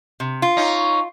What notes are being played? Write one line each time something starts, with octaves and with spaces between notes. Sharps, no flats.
C3
F4
C#4 D#4